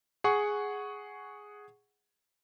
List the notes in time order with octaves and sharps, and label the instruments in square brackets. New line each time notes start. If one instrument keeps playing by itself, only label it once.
[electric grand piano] G#4 F#5 C#6